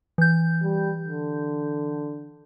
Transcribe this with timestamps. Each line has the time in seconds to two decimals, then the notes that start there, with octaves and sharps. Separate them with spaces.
0.18 E3 G6
0.62 G3
1.05 D3